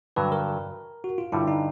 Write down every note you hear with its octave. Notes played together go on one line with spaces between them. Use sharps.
G2 D3 F#3 B4
A#4
F#4
F4
G2 D3 G3 E4
D#4